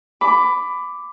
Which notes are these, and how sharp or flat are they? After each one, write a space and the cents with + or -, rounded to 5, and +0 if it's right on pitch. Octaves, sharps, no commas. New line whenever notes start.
B5 +20 D6 +0